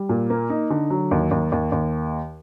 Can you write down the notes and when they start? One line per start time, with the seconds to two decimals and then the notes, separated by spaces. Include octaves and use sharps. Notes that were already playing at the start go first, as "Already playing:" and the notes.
Already playing: G3
0.09 A#2
0.30 A#3
0.50 D#4
0.70 D3
0.90 F#3
1.11 D#2
1.31 D#2
1.52 D#2
1.72 D#2